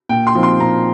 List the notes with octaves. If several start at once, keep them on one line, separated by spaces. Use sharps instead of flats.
A#2 G5
C6
F3 C4 D#4
C6
A#2 A#5